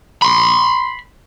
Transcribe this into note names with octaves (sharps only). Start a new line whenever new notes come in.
B5 C6